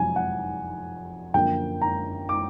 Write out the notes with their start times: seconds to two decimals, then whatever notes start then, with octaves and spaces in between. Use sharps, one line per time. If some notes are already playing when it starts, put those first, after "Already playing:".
Already playing: F2 C3 F#3 G#5
0.16 F#5
1.34 F#2 D3 F3 A#3 G5
1.82 A#5
2.29 D6